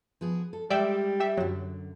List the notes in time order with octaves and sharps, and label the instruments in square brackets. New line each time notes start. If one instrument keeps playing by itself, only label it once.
[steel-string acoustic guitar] F3 B3 G#4
A4
[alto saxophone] G3 [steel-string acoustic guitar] G#3 [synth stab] D5 E5 G5
[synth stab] G4 E5
[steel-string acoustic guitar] F#2 D3 [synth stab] F#3